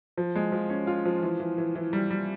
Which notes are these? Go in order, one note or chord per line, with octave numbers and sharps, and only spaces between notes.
F3
G#3
F3
C#4
F4
F3
E3
E3
E3
E3
G3
G3